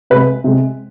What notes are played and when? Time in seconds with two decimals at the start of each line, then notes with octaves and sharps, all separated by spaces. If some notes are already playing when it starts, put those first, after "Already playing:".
0.10 C3 B4
0.15 G#3
0.44 C3 G#3